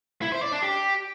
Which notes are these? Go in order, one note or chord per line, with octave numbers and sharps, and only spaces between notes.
E4
C5
D5
D4
G4